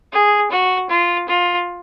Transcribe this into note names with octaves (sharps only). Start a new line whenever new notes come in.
G#4
F#4
F4
F4